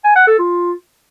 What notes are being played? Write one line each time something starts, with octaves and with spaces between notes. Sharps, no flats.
G#5
F#5
A4
F4